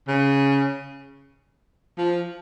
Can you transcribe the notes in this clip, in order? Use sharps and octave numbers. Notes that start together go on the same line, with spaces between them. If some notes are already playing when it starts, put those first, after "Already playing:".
C#3
F3